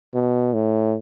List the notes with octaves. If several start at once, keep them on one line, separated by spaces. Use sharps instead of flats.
B2
A2